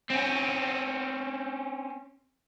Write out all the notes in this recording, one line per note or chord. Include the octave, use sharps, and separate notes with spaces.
C4 C#4